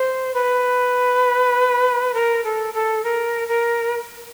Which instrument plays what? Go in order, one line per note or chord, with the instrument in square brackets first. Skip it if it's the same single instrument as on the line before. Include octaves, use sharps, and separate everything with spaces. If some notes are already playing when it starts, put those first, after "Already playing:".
Already playing: [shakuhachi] C5
B4
A#4
A4
A4
A#4
A#4